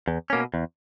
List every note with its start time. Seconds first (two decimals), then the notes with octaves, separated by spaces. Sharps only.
0.08 E2
0.30 B2 A#3 C#4
0.54 E2